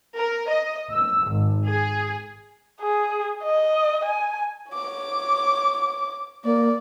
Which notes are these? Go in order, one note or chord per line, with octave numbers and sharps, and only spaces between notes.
A#4
D#5
E6
G#1
G#4
G#4
D#5
G#5
C#5 D6
A#3 D5